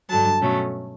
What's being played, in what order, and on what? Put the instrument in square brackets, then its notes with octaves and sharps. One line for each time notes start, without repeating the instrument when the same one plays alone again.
[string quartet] G2 D3 F#3 A5
B2 F#3 A3 C#4